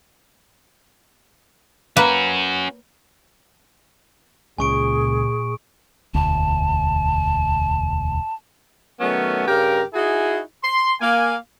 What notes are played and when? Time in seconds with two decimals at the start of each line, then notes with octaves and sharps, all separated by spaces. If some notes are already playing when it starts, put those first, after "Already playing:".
1.97 A#3 C#4 F#4 B4
4.58 C#2 A#2 C#3 G#4 G#5 C#6 D7
6.15 E1 D2 A5
9.00 D#3 F#3 A3 B3 C#4
9.48 G2 C#3 G4 A#4
9.94 D#4 E4 F#4 G#4
10.63 C6
11.01 A#3 F5 G#5